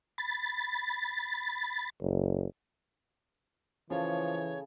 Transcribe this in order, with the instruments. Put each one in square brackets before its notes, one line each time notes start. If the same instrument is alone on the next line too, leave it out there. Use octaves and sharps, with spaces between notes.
[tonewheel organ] B5 A6
[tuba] F#1
[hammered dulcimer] C#3 A4 [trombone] E3 [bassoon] F3 [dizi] C#5